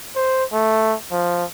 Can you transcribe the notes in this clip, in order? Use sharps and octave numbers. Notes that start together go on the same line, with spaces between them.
C5
A3
F3